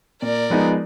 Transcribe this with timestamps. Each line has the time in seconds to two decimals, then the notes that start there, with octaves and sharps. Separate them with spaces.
0.22 A#2 A#4 D5
0.50 F3 G#3 B3 D#4